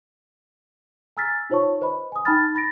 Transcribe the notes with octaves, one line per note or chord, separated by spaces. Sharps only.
G#5 A#5 E6 F6 A6 B6
D#4 F4 C5 C#5 A5 C#6
B4 C5 D#5 B5
G#5 D#6
D#4 G5 A5 B5 F6 A6
B5 A6 A#6 D7